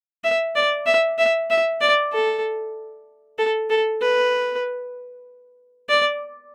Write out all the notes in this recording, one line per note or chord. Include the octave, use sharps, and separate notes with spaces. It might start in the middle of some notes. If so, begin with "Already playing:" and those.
E5
D5
E5
E5
E5
D5
A4
A4
A4
B4
D5